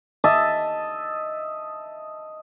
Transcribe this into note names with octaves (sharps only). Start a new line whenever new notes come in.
D#5 E5 A5